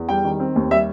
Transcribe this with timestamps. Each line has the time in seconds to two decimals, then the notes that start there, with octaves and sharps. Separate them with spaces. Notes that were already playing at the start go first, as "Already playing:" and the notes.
Already playing: E2
0.09 G3 G5
0.24 D#3
0.40 C4
0.56 D#2
0.71 G3 E5